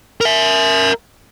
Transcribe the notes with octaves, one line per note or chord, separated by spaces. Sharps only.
A#4 E5